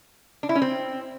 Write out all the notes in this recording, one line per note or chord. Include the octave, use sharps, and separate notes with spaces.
D4
E4
C#4
C4